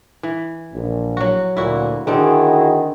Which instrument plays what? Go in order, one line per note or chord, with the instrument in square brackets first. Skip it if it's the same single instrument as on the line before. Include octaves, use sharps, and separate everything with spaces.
[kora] E3
[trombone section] A#1
[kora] F#3 F#4
[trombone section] D2 A#2 [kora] E4 F#4
[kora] D3 C4 A4 [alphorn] D#3 [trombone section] E4 F#4 G#4